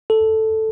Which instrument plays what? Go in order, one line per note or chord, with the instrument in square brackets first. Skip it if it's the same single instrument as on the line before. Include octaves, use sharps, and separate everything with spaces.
[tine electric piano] A4